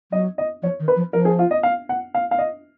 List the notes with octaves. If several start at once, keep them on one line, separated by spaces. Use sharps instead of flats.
F#3 D#5
D#5
F3 C#5
D#3
B4
F3
F3 A#4
G#4
F4
D#5
F5
F#5
F5
F5
D#5